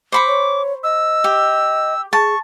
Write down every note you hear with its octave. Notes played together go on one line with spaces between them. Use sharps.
C5 B5 C#6 D6
C#5
D#5 E6
G4
G#4 A5 C#6